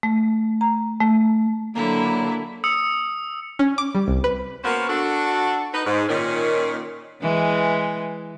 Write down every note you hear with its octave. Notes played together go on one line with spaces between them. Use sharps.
A3
A#5
A3
D3 F#3 A#3 D4 E4
D#6 E6 C#7
C#4
D6
G3
C2
B4
A#3 B3 C#4 F#4 A#4 C5
D4 F#4 A4
D#4 B4
G#2
A#2 D#3 C#4
E3 G#3